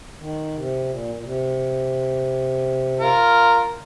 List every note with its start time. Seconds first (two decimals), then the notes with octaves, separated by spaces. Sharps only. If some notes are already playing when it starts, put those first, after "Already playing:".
0.19 D#3
0.54 C3
0.89 A#2
1.15 A#2
1.24 C3
2.99 F4 A#4